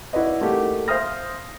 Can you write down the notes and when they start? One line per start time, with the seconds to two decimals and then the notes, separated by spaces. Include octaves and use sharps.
0.13 E4 F#4 B4 D5 D#5
0.41 A3 A#3 D#4 E4 F#4 G4
0.88 C5 E5 F5 D#6 F6 A#6